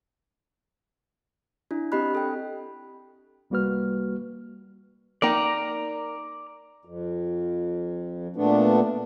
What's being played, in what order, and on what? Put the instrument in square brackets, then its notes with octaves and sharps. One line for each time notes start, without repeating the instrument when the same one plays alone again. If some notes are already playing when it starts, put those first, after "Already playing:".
[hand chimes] D4 E4
C4 D4 G4 D#5 B5 F#6
A4 G5
[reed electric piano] C2 G3 A#3 F#4 B4 F6
[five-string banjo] A#3 D#4 G5 [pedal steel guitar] D5 A#5
[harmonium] F2
A#2 A3 B3 D4